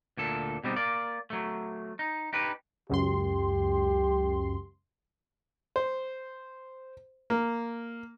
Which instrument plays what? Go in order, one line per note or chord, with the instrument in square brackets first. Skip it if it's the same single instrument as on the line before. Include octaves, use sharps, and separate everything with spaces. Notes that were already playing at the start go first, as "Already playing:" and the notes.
[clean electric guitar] D2 A#2 A4
B2 G3 C4 D#4
A#3 D5
F#3 A3
D#4
D#4 G4 B4
[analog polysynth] C#2 F#2 C6 [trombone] G4
[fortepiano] C5
A#3